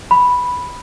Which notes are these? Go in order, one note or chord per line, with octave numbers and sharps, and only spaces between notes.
B5